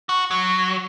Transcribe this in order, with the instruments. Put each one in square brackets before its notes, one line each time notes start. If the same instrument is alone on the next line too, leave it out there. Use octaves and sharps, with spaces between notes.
[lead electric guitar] F#4
F#3